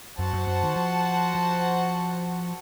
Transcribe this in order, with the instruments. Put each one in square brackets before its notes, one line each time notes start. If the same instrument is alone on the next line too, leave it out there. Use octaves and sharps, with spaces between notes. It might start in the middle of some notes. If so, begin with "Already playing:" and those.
[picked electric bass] F#2 [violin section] F#4 C5 F#5 A5
[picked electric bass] F#2
F#2
D#3
F3
F3